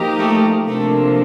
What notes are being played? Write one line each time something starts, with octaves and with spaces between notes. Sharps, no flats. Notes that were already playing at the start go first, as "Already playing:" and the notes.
Already playing: F3 A#3 D#4 G4 A#4
A3
C3 F3 A3 A#3 D4 A4